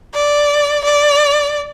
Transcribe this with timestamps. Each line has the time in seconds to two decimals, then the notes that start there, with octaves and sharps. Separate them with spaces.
0.14 D5
0.84 D5